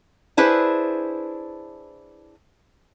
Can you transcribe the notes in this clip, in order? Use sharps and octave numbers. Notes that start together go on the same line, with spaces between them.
D4 E4 G#4 B4 C5